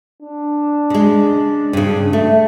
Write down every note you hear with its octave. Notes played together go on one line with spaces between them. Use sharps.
D4
C#3 G#3
G2 C#3
A3